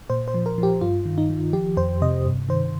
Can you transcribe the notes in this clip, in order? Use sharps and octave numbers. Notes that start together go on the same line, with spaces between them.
A#2 C5
C5
F3
A#4
F3 G4
G2 F4
D#3
D#4
D#3
F3 G4
F2 C5
C3 D#5
G2
D#3 C5